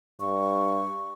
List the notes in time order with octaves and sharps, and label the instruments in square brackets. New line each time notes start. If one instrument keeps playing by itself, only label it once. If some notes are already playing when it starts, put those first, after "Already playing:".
[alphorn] G2 [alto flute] C#6